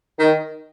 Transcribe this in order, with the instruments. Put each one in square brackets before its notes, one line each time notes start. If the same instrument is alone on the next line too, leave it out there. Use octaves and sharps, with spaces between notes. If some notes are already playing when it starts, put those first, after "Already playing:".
[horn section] D#3